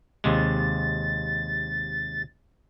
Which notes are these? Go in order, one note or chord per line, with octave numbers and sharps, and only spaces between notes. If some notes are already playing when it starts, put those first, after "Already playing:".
D#2 C3 G#3 A6